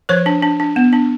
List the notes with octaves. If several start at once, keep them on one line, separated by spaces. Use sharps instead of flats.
F3 B4 C#5
D4
D4
D4
B3
D4